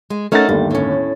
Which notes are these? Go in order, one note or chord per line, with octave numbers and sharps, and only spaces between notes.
G#3
A3 C#4 D#4 A#4 F#5 A6
G1 D#2 G3
A2 C#4